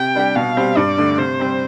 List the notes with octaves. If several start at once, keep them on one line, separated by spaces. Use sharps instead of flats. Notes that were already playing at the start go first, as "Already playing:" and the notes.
Already playing: C3 G5
G3 D4 G4
B2 F5
G3 C4
G2 D5
D3 A3
C3 C5
G3 C4